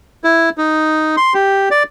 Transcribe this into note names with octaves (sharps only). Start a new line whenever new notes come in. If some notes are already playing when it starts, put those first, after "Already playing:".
E4
D#4
C6
G4
D5